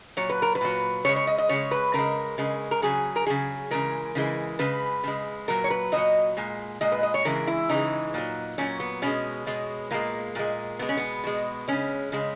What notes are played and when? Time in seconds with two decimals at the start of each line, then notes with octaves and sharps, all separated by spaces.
0.17 A#2 F#3 C#5
0.29 B4
0.42 A#4
0.55 B4
0.61 A#2 F#3
1.05 C#3 C#5
1.09 G#3
1.16 C#5
1.27 D#5
1.38 D#5
1.49 C#3 G#3 C#5
1.71 B4
1.94 C#3 G#3 A#4
2.38 C#3 G#3
2.71 A#4
2.82 C#3 F#3 G#4
3.16 A#4
3.27 C#3 F#3 G#4
3.71 C#3 E3 G#3 A#4
4.15 C#3 E3 G#3
4.59 C#3 G#3 B4
5.03 C#3 G#3
5.48 A#2 F#3 A#4
5.64 C#5
5.70 B4
5.92 A#2 F#3 D#5
6.37 A#2 G#3
6.81 A#2 G#3 D#5
6.92 B4
7.03 D#5
7.14 C#5
7.25 C#3 E3 G#3 A#4
7.47 E4
7.69 C#3 E3 G#3 D#4
8.14 A#2 F#3
8.58 A#2 F#3 C#4
8.80 B3
9.02 B2 G#3 C#4
9.47 B2 G#3
9.91 A#2 G#3 A#3
10.35 A#2 G#3
10.79 B2 G#3 B3
10.89 C#4
10.97 B3
11.24 B2 G#3
11.68 C#3 G#3 C#4
12.12 C#3 G#3